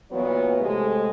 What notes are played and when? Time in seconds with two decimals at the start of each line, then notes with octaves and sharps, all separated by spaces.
0.11 A#2 E3 F#3 B3 C#5
0.59 A2 C3 G#3